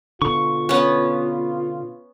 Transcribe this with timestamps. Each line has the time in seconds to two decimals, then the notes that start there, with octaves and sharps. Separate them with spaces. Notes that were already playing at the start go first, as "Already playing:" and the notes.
0.22 B2 D3 F4 C#6
0.69 B3 C#4